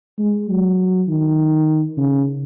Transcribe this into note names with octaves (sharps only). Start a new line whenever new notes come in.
G#3
F#3
D#3
C#3